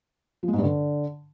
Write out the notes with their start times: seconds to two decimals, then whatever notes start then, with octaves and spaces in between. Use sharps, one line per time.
0.43 F3
0.48 G#3
0.53 G#2
0.58 G2
0.64 D3